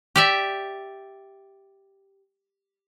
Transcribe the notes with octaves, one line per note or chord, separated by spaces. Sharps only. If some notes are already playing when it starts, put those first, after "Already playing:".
G4 D5 E5